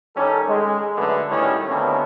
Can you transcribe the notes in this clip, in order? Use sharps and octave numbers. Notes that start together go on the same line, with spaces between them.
D#3 G3 C#4 G4 A4
G#3
F#2 D3 A3 B4
A2 D#3 G3 C#4
B2 D3 A3 A#3 C4 C#4